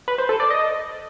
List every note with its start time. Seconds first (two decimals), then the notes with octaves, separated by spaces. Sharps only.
0.08 B4
0.18 C5
0.29 A4
0.40 D5
0.50 D#5